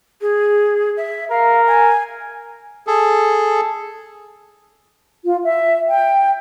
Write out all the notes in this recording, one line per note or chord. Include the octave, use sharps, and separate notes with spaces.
G#4
E5
A#4 F5
G#5
G#4 A4
F4
E5
G5